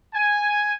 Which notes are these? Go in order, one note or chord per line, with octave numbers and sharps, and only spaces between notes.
G#5